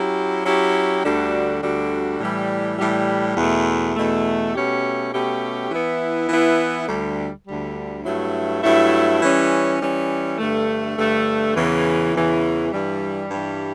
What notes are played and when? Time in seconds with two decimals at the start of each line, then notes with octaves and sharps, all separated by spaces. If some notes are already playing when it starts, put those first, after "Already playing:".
Already playing: F#3 C#4 E4 G4
0.45 F#3 C#4 E4 G4
1.04 D2 D3 G3 D4 F#4
1.62 D2 D3 G3 D4 F#4
2.20 A2 E3 G3
2.78 A2 E3 G3
3.36 E2 B2 A3
3.95 E2 B2 A3
4.54 B2 A3 C#4 G4
5.13 B2 A3 C#4 G4
5.70 E3 B3 E4
6.29 E3 B3 E4
6.87 D2 D3 G3
7.45 D2 D3 G3
8.04 G2 F#3 A3 E4
8.62 G2 F#3 A3 E4
9.21 E3 G3 C#4
9.79 E3 G3 C#4
10.38 G2 D3 A3
10.96 G2 D3 A3
11.54 E2 C#3 E3
12.13 E2 C#3 E3
12.71 G2 E3 G3
13.30 G2 E3 G3